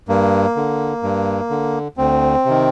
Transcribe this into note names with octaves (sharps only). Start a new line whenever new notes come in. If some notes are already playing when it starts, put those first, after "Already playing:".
G2 A#3
D3
G2
D3
D2 C4
C3 D#3